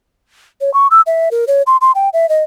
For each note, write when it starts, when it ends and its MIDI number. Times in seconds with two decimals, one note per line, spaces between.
0.61 0.72 73
0.74 0.87 85
0.91 1.01 88
1.06 1.29 76
1.31 1.45 70
1.47 1.62 73
1.67 1.77 84
1.81 1.92 84
1.95 2.09 79
2.13 2.28 76
2.29 2.44 75